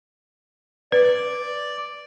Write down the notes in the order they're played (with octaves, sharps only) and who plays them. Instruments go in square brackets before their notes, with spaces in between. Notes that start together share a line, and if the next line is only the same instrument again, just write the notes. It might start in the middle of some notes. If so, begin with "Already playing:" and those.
[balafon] B4 [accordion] D5